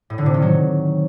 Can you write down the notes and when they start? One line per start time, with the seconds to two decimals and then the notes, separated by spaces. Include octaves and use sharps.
0.10 A2
0.18 D3
0.26 C3
0.34 D#3
0.42 F#3